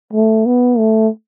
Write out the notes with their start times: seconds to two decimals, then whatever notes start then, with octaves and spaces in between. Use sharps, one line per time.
0.13 A3
0.46 B3
0.78 A3